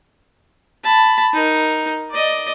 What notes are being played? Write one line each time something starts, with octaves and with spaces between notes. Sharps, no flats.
A5 B5
D#4 A#4
D5 D#5